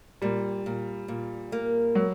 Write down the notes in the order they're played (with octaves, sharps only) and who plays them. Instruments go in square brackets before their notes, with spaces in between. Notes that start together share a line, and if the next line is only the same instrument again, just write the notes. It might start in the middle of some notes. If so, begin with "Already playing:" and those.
[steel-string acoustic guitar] A#2 [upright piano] G3
[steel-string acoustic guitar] A#2
A#2
A#3
[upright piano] F#3